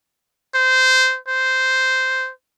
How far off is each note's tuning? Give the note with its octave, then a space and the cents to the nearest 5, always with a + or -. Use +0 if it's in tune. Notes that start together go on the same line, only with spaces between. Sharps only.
C5 -15
C5 -10